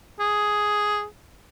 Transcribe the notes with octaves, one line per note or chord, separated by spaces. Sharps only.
G#4